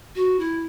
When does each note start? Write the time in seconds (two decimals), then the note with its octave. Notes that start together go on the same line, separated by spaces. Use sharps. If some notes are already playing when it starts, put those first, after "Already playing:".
0.16 F#4
0.39 E4